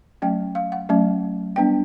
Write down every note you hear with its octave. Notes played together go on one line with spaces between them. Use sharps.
F#3 A3 C#4 G5
F5
F#5
F#3 A3 C#4
G3 B3 D4 G5